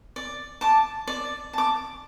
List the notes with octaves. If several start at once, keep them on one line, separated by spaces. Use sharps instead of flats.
D5
A5 D6
D5
A5 D6